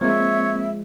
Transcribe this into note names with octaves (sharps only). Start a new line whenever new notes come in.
F3 G#3 A#3 C4 C#5 E5